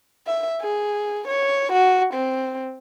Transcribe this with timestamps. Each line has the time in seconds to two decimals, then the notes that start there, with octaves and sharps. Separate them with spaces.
0.27 E5
0.61 G#4
1.27 C#5
1.72 F#4
2.13 C4